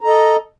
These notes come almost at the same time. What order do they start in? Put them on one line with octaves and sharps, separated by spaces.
A#5 A4 D#5